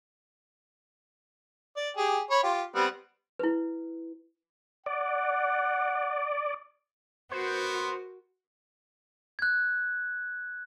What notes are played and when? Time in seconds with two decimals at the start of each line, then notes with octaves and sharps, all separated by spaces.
1.77 D5
1.97 G4 G#4
2.31 C#5 B5
2.43 F4 G4
2.75 G3 B3 C4
3.39 E4 B4
4.86 D5 F#5
7.32 B3 F#4 A#4 C5
9.39 F#6 G#6